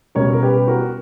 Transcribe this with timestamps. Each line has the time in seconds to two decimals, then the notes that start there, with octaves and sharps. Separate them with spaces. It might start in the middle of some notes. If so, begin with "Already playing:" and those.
0.15 B2 G3 C#4 A#4 C#5
0.33 A#4
0.42 G4 B4
0.68 F#4 A#4